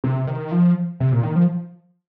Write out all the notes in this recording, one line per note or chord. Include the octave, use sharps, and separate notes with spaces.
C3
D#3
F3
C3
A#2
D#3
F3